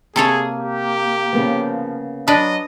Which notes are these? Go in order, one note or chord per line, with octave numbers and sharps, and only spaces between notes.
C3 A#3 G#4 A4 C#5
G4
C#3 F3 A#3 B3
F#3 D4 B4 D#5